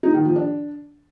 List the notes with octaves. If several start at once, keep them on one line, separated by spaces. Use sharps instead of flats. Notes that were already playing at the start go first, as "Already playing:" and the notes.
D#4
D#3
F3
D4